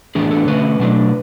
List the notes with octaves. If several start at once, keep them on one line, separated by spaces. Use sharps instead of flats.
A2 E3 B3 D4 G#4
A4
D3 A3 C#4 B4
B2 F#3 A3 D4